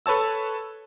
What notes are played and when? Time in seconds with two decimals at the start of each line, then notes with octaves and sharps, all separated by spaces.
0.06 A4 B4 C#5 A5 E6